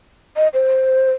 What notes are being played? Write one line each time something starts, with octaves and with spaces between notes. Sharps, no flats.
D#5
C5